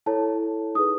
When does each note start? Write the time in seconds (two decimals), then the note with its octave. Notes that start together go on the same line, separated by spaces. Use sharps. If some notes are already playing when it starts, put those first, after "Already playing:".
0.06 E4 A4 C#5 A5
0.75 D#4 G#4 B4 D#6